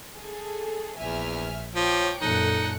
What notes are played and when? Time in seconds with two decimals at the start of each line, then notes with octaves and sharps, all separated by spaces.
0.16 G#4 A4
0.98 A#1 E2 E5 G#5 F6
1.76 F3 C#5 G5 D6
2.21 F#2 A#2 D#4 A4 F#6 C#7